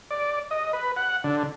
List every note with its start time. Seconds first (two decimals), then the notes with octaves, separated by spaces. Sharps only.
0.11 D5
0.51 D#5
0.73 B4
0.97 F#5
1.24 D3